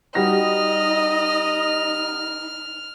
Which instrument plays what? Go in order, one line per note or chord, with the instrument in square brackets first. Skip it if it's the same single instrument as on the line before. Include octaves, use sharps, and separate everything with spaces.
[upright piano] G3 F#4 A#6 [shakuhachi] D#4 [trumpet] D#5 [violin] F6